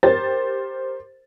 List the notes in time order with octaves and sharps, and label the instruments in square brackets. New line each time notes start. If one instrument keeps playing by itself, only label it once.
[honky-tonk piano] G4 A#4 C5 A6